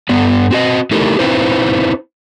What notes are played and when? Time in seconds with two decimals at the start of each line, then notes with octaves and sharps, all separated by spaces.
0.09 G2 B3 D5
0.51 C4 F#4 D#5
0.91 A3 D#4 E4 G4 A4 A#4
1.19 C4 D#4 E4 B4 C5